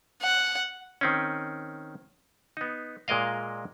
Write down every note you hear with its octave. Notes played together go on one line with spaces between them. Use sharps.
F#5
D#3 C4 C#4
B3 D#4
A#2 G#3 A#4 D#5 F5